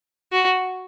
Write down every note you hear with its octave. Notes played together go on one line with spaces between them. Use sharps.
F#4